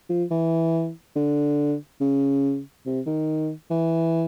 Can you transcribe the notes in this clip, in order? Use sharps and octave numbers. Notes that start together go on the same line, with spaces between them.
F3
E3
D3
C#3
C3
D#3
E3